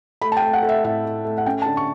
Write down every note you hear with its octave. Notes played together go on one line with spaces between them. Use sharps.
A3 B5
A5
G5
A3
F#5
A3
E5
A2 E5
A3
A3
F#5
C#4 G5
A5
D3
C#6